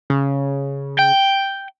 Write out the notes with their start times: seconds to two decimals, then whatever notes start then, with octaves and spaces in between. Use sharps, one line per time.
0.10 C#3
0.99 G5